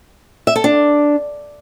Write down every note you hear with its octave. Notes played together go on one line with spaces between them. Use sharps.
E5
A4
D4